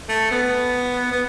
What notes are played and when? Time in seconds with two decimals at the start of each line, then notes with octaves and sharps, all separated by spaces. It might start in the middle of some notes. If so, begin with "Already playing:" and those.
0.09 A3
0.31 B3
1.11 B3